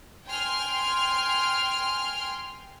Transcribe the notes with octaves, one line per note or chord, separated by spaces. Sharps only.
G5 G#5 C6 F6